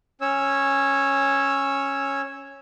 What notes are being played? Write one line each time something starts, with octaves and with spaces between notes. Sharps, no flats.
C#4 C#5 E6